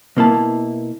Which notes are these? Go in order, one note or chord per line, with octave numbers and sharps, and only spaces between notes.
B2 A#3 E4 A5